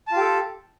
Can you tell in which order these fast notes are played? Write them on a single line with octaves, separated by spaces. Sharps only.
A5 F4 G4 A4